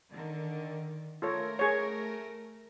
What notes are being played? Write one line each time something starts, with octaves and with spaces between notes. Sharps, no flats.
D3 D#3
A3 F4 A4 A#4 C#5
G#4 C#5